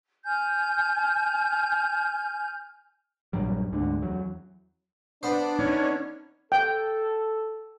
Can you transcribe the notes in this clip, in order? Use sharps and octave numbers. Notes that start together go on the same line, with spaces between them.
G#5 F6 G6
A#1 G2 F#3 G3
D2 G#2 D3
E2 F#3
B3 D4 C5
C#4 D#4
A4 G5